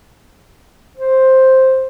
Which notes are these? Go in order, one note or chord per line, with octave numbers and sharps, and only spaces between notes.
C5